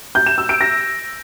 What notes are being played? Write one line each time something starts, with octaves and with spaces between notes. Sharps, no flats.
G6
E7
E6
D7
A#6